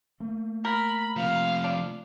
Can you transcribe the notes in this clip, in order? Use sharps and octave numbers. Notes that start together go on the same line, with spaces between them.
A3 A#3
A#4 B5
C3 F3 F5
D4